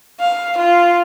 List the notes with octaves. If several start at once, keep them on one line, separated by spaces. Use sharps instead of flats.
F5
F4